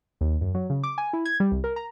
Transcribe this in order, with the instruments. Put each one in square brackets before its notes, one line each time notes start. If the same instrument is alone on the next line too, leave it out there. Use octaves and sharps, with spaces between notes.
[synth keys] D#2
F#2
F#3
C#3
D6
G#5
E4
G#6
G3
C2
A#4
A#5